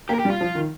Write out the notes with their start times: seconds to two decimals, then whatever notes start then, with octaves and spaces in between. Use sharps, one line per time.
0.09 A#3 G4
0.14 A#4
0.20 G4
0.25 G3
0.30 F4
0.41 F3
0.55 D#3